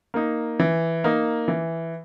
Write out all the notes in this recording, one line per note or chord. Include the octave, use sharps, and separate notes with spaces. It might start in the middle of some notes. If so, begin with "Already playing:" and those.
A#3 D#4
E3
A#3 D#4
E3